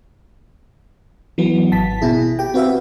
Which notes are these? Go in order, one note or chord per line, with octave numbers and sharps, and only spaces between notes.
E3 F#3 B3
G#1 A5 B6
B2 E4 G#4
G4 G5
C4 F#4 B4 E5 F5